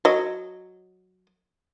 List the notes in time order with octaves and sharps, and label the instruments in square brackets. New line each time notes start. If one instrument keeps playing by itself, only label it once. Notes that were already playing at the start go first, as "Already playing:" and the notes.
[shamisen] F#3 D#5